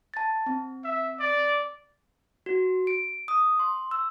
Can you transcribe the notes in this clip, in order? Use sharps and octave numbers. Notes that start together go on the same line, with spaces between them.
A5 A6
C4
E5
D5
F#4
D7
D#6
C6
E6